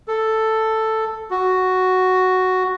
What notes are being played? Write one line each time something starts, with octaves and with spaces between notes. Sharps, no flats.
A4
F#4